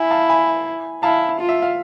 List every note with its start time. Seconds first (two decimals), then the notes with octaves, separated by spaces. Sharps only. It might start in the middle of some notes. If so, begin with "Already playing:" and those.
Already playing: E4 G#5 B5
0.11 F5 A5
0.29 G#5 B5
1.03 E4 F5 A5
1.40 F4
1.49 E5
1.62 F5